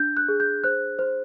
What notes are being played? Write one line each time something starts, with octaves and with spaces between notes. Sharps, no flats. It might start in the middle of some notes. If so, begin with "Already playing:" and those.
Already playing: D4 G6
F#6
G#4
G6
C5 F#6
C5